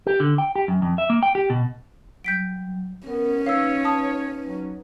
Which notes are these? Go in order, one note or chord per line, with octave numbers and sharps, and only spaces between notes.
G4
D3
G5
G4
F#2
F2
E5
A#3
G5
G4
B2
F#3 G3 G6 B6 D7
B3 C#4 A#4
D#4 B4 C#5 F5 E6
A5 D#6
F#3